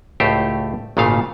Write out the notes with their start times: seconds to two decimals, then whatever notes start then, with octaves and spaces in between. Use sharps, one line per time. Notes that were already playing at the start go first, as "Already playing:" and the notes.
0.20 C#2 A2 A3 G4 C5
0.97 G#1 A#2 C#3 A3 F5